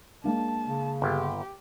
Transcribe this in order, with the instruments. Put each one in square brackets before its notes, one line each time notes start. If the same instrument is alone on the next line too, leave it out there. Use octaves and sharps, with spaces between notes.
[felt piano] G#3 A#3 D4 [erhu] A5
[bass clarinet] C#3
[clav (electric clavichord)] G1 [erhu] G4